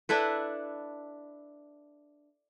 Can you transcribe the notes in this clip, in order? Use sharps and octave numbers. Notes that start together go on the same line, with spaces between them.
D4 E4 A4 B4